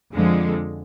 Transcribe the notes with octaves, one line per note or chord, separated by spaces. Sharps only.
F2 D3 F3 G#3